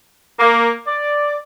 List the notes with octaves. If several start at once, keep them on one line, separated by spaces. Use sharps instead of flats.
A#3
D5